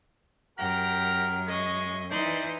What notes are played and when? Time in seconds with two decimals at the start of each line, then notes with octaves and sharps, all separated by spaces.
0.59 F#2 G4 A#4 F#5 A#5 F6
1.47 G#3 D#5 C#6
2.11 E3 D#4 C5 D5 C6